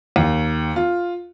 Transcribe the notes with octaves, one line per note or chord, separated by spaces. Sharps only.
D#2
F4